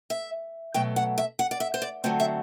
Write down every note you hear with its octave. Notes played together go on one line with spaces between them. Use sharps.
E5
B2 F#3 A3 G5
F#5
E5
F#5
D5
E5
C5
D5
D3 F#3 A3 C4 C5
E5